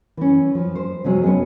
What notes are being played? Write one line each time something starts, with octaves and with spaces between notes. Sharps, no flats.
E3 C#4
F3
C5
C3 F3 F#3 G#3 C4 G#4
B3 C#4 F4 G#4